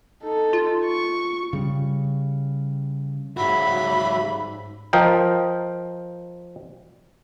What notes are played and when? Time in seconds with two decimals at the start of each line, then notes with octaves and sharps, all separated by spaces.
0.22 D#4 A4
0.53 F4
0.85 C#6
1.53 C#3 G3
3.37 G#2 C#3 G3 F#4 E5 B5
4.93 F3 A#4 D#5 G5